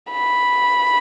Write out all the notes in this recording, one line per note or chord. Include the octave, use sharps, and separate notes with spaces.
B5